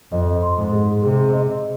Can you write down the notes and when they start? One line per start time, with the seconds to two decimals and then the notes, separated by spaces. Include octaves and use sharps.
0.12 F2 D#5
0.42 C6
0.57 G#2
0.72 G#4
1.03 C3 G#4
1.33 D#5